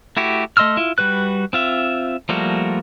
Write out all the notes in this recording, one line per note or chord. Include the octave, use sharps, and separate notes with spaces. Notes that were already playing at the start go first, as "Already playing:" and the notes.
A3 E4 F#4 G4
A3 D#5 C6 E6 F6
E4 F4
G3 F#4 B4 F#6
C4 F4 E5
F3 G3 A3 A#3 F#4